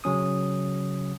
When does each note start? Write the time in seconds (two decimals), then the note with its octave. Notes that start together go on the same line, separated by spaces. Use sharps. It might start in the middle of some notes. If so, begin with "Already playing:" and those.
0.04 C#3 F#3 C#4 D#6